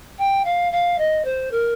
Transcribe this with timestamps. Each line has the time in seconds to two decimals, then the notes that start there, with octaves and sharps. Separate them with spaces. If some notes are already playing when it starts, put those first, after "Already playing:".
0.18 G5
0.44 F5
0.72 F5
0.98 D#5
1.25 C5
1.51 A#4